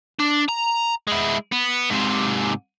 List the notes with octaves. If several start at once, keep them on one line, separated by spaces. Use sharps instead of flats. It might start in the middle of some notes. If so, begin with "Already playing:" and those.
D4
A#5
G#3 E4
B3
G#2 C3